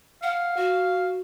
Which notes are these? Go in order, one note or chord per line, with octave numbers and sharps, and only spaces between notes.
F5 F#5
F#4